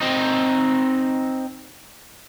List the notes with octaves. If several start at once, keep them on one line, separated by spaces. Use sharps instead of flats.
C4 D#4